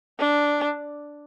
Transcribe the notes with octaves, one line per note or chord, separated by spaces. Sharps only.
D4